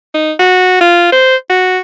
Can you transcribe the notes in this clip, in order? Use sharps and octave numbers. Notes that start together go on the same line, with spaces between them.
D#4
F#4
F4
C5
F#4